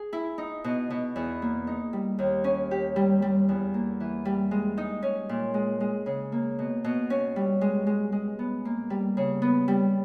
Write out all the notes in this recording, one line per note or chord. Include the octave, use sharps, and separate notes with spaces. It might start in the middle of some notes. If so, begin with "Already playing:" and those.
Already playing: G#4
E4
D#4
B2
B2
E2
A#3
D#4
G3
D#2
C#4
G4
G3
G3
E2
A#3
E3
G3
G#3
D#4
C#4
A#2
G#3
G#3
C#3
A#3
B2
B2
C#4
G3
G#3
G#3
G#3
B3
A#3
G3
C#3
B3
G3